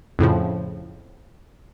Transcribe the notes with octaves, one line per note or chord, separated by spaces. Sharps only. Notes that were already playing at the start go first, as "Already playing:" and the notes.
F2 A2 C#3 F3